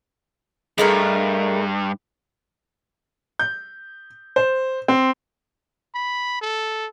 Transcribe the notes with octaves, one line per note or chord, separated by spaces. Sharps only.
G2 G#3 A3 A#4
G6
C5
C4
B5
A4